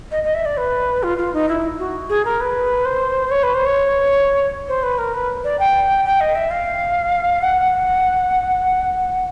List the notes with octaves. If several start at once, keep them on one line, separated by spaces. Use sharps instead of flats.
D#5
D#5
E5
D5
B4
F4
F4
D#4
E4
F#4
G#4
A#4
B4
C5
C#5
B4
C5
C#5
C5
B4
A#4
B4
D5
G5
G5
D#5
E5
F5
F#5